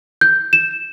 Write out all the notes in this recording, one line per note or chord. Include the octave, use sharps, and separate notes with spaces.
G6
E7